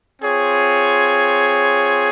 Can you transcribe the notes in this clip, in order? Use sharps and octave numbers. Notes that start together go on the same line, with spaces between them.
C4 F4 G#4 C#5